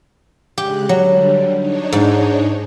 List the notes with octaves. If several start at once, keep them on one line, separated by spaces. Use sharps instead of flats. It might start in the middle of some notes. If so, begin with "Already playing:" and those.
C#3 G#3 G4 F#6
D3 F#3 G3
D4 D#4 C#5
G#2